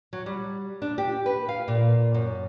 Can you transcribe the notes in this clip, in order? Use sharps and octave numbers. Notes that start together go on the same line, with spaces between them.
F#3
G3
D4
G4
B4
F5
A#2
F#2